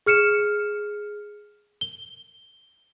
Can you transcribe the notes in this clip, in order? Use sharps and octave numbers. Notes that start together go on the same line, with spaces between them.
G#4 F6 C#7 E7
G7